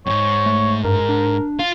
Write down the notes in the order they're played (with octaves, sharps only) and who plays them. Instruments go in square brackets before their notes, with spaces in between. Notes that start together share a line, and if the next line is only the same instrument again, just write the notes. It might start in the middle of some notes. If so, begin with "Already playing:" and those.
[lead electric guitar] F2 G#2 [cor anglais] C#5
[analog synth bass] A3
[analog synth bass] G2 [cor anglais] A#4
[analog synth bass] D4
[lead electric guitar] F4